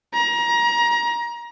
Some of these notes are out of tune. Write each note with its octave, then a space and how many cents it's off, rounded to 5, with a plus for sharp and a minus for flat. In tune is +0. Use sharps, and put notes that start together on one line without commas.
A#5 +25